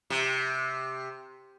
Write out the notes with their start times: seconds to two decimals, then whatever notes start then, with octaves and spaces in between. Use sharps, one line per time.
0.10 C3